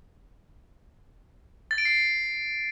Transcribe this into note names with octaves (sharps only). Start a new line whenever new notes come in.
A6
D7
C7